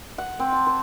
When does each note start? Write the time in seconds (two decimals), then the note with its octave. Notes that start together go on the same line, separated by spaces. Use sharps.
0.18 F#5
0.39 C4
0.52 A5
0.67 C5